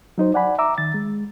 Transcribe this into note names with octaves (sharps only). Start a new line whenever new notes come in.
F#3 D#4 C5
D5 F#5 G#5 B5
E5 A#5 D6 E6
D#3 A6
G#3